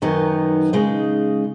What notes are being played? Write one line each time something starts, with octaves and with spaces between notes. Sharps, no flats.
F#2 D#3 F#3 B3 D#4
C#3 G#3 D#4